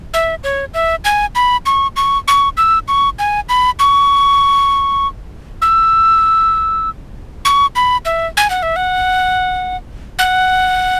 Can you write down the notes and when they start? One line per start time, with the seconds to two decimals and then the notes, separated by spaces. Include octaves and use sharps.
0.14 E5
0.44 C#5
0.74 E5
1.05 G#5
1.35 B5
1.66 C#6
1.96 C#6
2.28 C#6
2.57 E6
2.88 C#6
3.19 G#5
3.49 B5
3.80 C#6
5.62 E6
7.45 C#6
7.76 B5
8.05 E5
8.37 G#5
8.50 F#5
8.63 E5
8.76 F#5
10.19 F#5